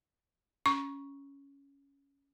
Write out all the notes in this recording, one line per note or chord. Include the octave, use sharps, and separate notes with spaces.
C#4 C#6